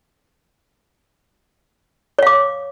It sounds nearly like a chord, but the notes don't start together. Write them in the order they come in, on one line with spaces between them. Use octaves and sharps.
C#5 F5 D6